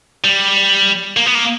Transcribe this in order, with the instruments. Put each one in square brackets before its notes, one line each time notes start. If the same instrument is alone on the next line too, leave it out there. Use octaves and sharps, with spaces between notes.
[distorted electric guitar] G3
A#3
B3
A#3